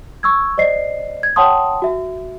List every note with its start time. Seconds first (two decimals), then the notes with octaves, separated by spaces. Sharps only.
0.23 C#6 E6 G#6
0.58 C5 D5 D#5 C7
1.23 G#6
1.36 C#5 F#5 G5 A5 C6 D#6
1.82 F#4 E5